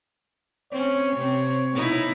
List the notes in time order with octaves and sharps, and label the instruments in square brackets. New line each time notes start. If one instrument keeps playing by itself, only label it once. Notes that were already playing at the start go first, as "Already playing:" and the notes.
[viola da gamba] C4 C#4 [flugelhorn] C#5
[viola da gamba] C3 C4
B2 D#4 E4